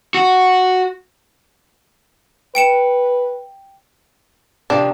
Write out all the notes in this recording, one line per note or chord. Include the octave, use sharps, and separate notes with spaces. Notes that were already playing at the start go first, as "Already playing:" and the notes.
F#4
B4 G5 C#7 E7
C3 D#3 F3 D4